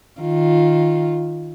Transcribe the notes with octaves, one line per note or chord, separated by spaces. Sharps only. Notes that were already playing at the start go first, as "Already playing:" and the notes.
D#3 F4